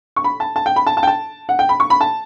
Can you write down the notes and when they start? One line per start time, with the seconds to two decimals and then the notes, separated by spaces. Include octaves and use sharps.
0.16 C#6
0.24 B5
0.40 A5
0.56 A5
0.66 G5
0.76 B5
0.87 A5
0.97 A5
1.03 G5
1.07 A5
1.49 F#5
1.59 G5
1.69 B5
1.80 C#6
1.90 B5
2.01 A5